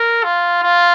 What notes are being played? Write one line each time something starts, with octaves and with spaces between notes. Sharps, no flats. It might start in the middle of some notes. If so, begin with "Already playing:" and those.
Already playing: A#4
F4
F4